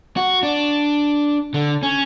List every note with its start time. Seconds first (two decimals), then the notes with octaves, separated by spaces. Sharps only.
0.17 F#4
0.43 D4
1.54 D3
1.83 C#4